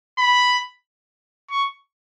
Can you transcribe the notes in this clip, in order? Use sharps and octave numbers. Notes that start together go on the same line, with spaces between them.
B5
C#6